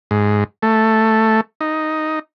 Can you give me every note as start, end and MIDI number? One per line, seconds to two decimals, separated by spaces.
0.11 0.44 44
0.63 1.41 57
1.61 2.19 63